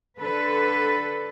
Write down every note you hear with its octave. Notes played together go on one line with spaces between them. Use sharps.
D3 A4 B4